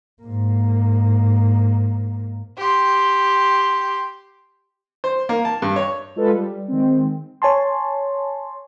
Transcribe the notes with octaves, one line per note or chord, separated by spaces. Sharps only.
G#2 A#3
G4 C6
C5
A#3
A5
G2
C#5
G#3 F4 A4 B4
G3
D#3 G#3 C4
C#5 G#5 A5 C6